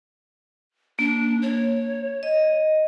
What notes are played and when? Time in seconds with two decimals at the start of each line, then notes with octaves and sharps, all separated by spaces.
0.99 A#3 D4
1.42 C#5
2.23 D#5